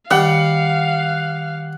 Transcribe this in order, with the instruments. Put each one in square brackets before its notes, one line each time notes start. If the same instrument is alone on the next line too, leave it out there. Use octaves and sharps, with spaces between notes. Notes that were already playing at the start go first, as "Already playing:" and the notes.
[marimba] D#3 [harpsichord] G3 [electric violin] F5 [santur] F#5